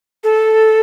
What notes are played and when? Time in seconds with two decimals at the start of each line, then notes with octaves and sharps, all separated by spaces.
0.24 A4